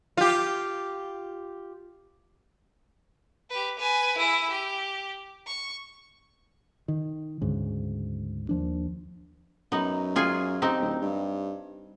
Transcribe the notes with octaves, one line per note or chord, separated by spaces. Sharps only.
F4 G4
G4 B4
B4 G#5
E4 G#4
G4
C#6
D#3
D2 G#2 C#3
D#2 F3 D4
F#2 B3 D#4
F4 G#4 G#5
C4 D#4 G4
D1
G2